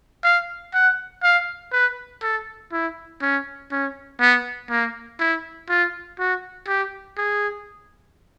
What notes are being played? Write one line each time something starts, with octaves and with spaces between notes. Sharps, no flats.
F5
F#5
F5
B4
A4
E4
C#4
C#4
B3
A#3
E4
F4
F#4
G4
G#4